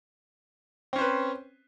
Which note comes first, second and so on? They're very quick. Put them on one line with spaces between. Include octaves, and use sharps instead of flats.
C4 C#4 C5 B4